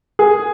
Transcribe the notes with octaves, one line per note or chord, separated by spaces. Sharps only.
G#4